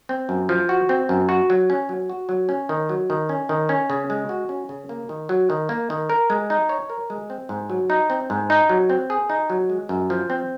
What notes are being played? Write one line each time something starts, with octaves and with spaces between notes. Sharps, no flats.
C4
F#2
F3
F#4
C4
F#2
F#4
F#3
C#4
F#3
F#4
F#3
C#4
D#3
F#3
D#3
C#4
D#3
C#4
C#3
G#3
F#4
C#4
C#3
A#3
D#3
F#3
D#3
A#3
D#3
A#4
G#3
D#4
C#5
A#4
G#3
C4
G#2
F#3
D#4
C4
G#2
D#4
F#3
C4
G#4
D#4
F#3
G#3
F#2
F3
C4